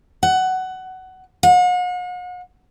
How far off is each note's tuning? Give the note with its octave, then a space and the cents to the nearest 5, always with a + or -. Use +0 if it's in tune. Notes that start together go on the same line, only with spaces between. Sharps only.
F#5 +15
F#5 -45